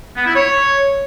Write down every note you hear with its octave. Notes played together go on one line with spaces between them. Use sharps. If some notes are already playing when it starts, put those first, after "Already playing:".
B3
E4
C#5